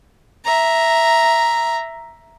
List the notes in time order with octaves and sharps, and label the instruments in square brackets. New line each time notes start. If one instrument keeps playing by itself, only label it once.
[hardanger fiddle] E5 A#5